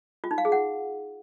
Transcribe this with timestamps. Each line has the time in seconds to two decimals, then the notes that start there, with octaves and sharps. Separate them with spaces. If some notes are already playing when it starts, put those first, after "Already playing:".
0.24 F4
0.31 D#4
0.38 F5
0.45 G#4
0.52 F#5